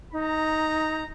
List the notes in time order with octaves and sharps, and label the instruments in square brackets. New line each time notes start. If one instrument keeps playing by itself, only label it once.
[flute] D#4 [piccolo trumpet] A#5